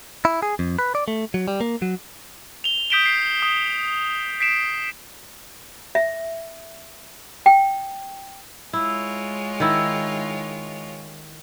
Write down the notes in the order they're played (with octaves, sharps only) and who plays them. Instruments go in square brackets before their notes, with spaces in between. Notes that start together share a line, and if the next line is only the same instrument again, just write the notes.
[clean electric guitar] E4
G#4
F2
B4
D5
A3
F#3
G3
A#3
F#3
[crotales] F7 G7
D#6 G6 B6 D7 E7 G7
C7
D#6
B6 C7 D7 E7
[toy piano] E5
G5
[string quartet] G#3 F4 C#5 [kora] E4
[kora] D#3 E4